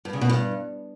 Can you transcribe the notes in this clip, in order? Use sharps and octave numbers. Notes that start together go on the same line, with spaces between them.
G2
C#3
B2
G2